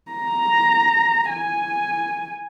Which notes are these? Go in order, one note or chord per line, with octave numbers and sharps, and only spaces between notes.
A#5
G#5